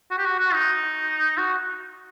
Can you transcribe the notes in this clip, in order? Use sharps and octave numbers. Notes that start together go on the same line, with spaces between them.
F#4
G4
F#4
F#4
D#4
F#4